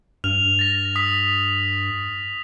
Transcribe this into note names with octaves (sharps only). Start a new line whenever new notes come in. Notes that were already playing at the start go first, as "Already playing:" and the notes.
G2 F6 F7
A6 A#6
D#6 B6